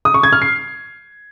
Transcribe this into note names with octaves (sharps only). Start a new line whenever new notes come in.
D#6
C#6
G#6
F6
C7